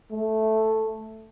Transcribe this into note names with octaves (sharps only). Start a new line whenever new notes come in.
A3